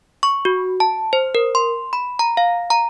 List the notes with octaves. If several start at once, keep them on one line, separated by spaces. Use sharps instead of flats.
C#6
F#4
A5
C5
A#4
C6
B5
A#5
F5
A#5